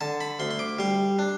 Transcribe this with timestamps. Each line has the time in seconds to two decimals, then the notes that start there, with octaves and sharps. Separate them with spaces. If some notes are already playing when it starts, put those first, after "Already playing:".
0.01 D3 A5
0.21 B5
0.39 D2 C6
0.51 C6
0.59 D6
0.79 G3 C6
1.19 D4